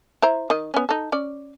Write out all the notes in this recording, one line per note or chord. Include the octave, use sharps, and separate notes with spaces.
E4 C5 A#5
D#3 D#5
B3 C#4
D#4 A4
C#4 D5